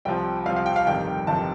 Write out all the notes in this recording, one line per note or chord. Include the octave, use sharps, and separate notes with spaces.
C2 C3 F3 G5
C2 C3 F3 F5
F5
G5
F5
G1 F2 C3 D#3 G5
G1 F2 C3 D#3 A5